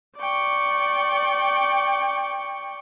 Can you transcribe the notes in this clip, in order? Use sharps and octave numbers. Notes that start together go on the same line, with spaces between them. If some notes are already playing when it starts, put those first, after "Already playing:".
D5 G5 C#6